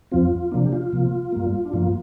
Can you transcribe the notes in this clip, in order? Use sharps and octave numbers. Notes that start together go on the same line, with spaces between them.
F2 F3 C4 F4
C3 F3 A#3 D4
G4
F4
C3 F3 A#3
G2 G3 A#3
D4
G2 F3 A#3 F4